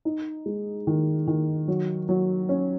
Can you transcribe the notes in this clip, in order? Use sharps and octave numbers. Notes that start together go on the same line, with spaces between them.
D#4
G#3
D#3
D#3
F#3
F#3
C#4